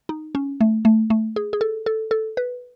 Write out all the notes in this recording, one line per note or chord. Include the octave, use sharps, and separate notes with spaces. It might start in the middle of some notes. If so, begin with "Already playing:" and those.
D#4
C#4
A3
A3
A3
G#4
G#4
A4
A4
A4
B4